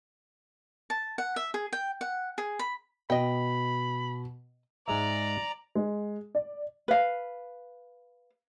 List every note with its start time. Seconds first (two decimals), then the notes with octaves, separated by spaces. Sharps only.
0.90 A5
1.18 F#5
1.36 E5
1.54 G#4
1.73 G5
2.01 F#5
2.38 G#4
2.59 B5
3.10 B2 D#5 G5 B5
4.88 G#2 G#3 D5 E5 A#5
5.75 G#3
6.35 D5
6.88 B4 F5